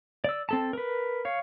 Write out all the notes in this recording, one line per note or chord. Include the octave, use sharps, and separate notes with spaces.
D5 E6
C4 A4 A5
A#4 B4
C#5 F5